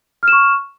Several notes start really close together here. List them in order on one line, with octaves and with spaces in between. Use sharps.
F6 E7 C#6